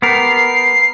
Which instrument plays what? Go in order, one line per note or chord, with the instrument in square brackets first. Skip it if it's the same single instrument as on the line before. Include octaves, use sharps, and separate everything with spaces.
[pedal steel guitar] B3 G4 A#4 [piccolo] C7